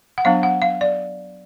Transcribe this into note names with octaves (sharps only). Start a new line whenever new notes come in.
F#5
F#3 B3 D4 F5
F#5
F5
D5